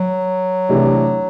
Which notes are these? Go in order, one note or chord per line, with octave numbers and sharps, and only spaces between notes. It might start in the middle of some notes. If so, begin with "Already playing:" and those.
Already playing: F#3
C3 E3 A3 D4